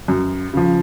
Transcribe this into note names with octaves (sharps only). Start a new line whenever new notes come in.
F#2
C#3 F3